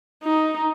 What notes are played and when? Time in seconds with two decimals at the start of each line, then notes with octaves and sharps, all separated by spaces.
0.23 D#4